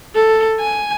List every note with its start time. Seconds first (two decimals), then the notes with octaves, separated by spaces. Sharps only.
0.15 A4
0.60 G#5